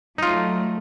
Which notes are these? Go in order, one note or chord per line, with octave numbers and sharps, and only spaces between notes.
F#3 A3 D#4 F4